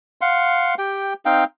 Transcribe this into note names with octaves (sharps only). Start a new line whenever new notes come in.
F5 F#5 C6
G4 G5
C4 D#4 F5 G5